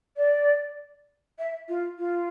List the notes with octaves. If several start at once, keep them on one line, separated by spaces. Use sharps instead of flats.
D5
E5
F4
F4